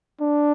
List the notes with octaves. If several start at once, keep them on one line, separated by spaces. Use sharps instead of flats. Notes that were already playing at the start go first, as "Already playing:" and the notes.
D4